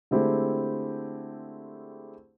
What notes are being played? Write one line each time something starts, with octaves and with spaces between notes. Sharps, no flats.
D3 G#3 A3 C4 E4 G4